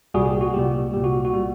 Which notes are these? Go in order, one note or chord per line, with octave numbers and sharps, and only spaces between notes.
C2 A#2 G3 F#4 G#4
G4
F#4
C2 A#2 G3 G4
C2 A#2 G3 G4
F#4
F#4
A#2 G3